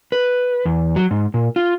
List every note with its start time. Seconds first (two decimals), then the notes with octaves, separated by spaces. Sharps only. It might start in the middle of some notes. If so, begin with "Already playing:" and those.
0.12 B4
0.65 E2
0.96 F#3
1.11 G#2
1.34 A#2
1.56 F4